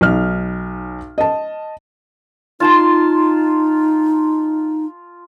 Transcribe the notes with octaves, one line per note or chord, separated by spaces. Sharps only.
B1 D#4 F6
D#5 A5
D#4 F4 A5 C6